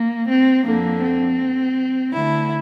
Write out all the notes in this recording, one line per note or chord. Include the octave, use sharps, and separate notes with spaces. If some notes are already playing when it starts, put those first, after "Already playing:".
Already playing: A#3
C4
F2 D3 A#3
C4
D2 D3 E4